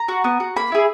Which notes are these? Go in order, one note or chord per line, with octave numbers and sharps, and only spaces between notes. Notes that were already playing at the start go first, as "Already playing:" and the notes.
Already playing: A#5
F#4
B3
F#4
A#3 B5
E4 G#4